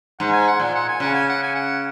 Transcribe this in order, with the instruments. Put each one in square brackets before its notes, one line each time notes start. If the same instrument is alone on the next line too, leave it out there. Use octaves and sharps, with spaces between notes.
[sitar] G#2 [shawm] F#5
[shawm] G#5
F#5
[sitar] A#2 [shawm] G#5
[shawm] F#5
G#5
[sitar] C#3 [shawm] F#5
[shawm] G#5
F#5
G#5
F#5